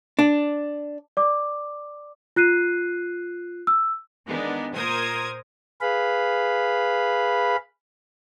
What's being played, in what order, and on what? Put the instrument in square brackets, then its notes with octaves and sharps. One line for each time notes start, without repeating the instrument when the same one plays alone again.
[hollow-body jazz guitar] D4
[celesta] D5 D6
F4 F#6 C7 D#7
E6
[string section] D#3 G#3 B3 D4 D#4
A#2 A#4 C5 D#6 G#6
[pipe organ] G#4 B4 F5 B5